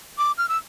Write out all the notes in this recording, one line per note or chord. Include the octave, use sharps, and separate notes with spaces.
D6
F6
E6